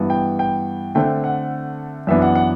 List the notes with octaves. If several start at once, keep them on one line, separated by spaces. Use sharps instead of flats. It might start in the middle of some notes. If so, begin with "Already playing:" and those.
Already playing: G2 E3 B3
G5
G5
D3 A3 C4 G5
F#5
F#2 E3 B3 D4 E5
F#5
F#5